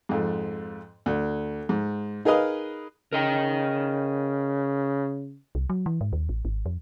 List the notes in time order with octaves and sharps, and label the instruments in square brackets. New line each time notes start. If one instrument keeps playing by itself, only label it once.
[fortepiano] F2 G#2
D2
G#2
D#4 G#4 A#4 B4 D#5 F5
[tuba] C#3 [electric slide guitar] A#4 D#5 G5
[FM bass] C2
F#3
E3
G#2
D#2
A1
G#1
F2